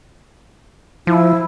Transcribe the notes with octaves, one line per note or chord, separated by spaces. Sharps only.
F3 E4